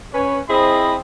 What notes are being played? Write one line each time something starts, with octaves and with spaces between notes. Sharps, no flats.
C#4 B4 C#5
C4 E4 G#4 C5 D#5 B5